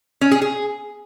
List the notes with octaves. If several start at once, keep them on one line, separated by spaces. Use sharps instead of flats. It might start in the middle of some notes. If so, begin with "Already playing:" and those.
C#4
G#4
G#4